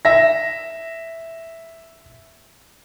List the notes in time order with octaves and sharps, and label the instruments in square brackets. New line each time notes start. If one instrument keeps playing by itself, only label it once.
[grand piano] E5 A#6